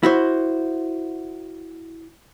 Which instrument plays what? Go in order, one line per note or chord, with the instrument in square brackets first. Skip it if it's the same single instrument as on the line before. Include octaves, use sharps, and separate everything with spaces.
[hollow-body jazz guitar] E4 F#4 C5